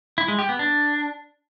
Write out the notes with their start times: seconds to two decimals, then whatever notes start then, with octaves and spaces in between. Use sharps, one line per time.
0.18 E4
0.28 G#3
0.39 G4
0.49 B3
0.59 D4